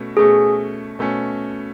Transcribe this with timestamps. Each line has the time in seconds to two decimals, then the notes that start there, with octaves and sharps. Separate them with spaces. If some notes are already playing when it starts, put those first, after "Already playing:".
Already playing: B2 A3 C#4
0.17 B2 A3 C#4 G#4
0.99 B2 A3 C#4